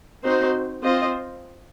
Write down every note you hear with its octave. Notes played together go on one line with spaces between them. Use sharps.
C4 D#4 F#4 C5
C4 F4 C5 D#5